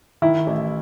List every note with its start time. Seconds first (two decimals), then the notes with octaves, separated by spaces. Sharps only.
0.22 D#3 E4
0.47 A1